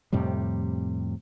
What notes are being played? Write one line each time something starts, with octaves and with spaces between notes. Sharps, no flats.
F2 A2 C3 G3